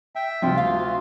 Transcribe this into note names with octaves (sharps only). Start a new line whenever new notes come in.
E5 G5
D2 G2 C3 F3 F4
F5